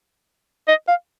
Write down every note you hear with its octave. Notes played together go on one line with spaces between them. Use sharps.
D#5
F5